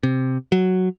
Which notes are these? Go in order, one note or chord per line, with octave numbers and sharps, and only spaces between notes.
C3
F#3